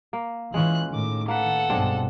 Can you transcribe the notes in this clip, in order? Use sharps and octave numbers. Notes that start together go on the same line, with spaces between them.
A#3
E3 G#3 C#4 F4 F#6
A2 D#3 D6
A#3 A4 B4 F#5
B1 G2 G#3 C4 D4